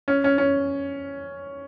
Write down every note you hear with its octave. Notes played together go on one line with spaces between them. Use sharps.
C#4
C#4
C#4